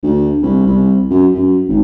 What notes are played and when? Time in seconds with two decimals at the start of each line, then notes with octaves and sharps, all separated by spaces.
0.03 D2
0.42 C2
0.67 C2
1.10 F#2
1.34 F#2
1.69 G#1